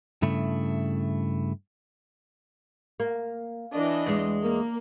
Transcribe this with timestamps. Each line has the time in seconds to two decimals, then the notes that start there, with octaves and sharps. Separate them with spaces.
0.22 G2 C#3 A3 E4
3.00 A#3
3.73 E3 D4 D#5
4.06 E2 G#3
4.42 A#3